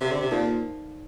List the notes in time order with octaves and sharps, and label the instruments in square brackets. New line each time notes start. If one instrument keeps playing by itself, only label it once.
[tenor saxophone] C3 [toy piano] C5 F5 C6
[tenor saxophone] D3
C3
[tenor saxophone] A#2 [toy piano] D#4 A4 D5 F5